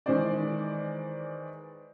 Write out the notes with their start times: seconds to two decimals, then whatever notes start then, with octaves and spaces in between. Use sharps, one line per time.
0.06 D#3 E3 G#3 G#4 C5 D5